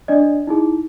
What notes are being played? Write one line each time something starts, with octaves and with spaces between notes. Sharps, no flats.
D4 D5 D#5
D#4 E4 G#4